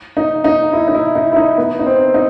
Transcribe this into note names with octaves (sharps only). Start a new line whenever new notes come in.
D#4
D#4
E4
D#4
E4
D#4
E4
D#4
B3
D#4
C4
D#4